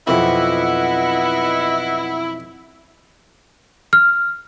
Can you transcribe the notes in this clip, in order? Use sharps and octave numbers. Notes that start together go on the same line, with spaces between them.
B1 F2 E4 B4 D#5 F#5
F6